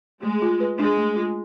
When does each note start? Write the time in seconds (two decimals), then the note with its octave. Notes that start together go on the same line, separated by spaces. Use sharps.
0.23 G#3 A3
0.42 F4
0.60 B4
0.79 G#3 D4
0.97 A3
1.16 F4